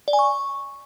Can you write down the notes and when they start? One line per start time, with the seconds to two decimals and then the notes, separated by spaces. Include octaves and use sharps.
0.08 D5
0.13 G#5
0.19 C#6